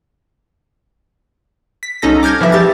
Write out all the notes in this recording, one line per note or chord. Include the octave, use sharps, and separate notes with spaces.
B6
C2 C#4 D#4 A4 A#6
D6 F6 G6 G#6 A#6
E3 F3 G3 E5
G3 G4 A6